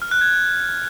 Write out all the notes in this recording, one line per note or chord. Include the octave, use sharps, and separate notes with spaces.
F6
F#6
G#6